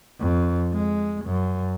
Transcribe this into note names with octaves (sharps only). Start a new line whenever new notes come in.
F2
G#3
F#2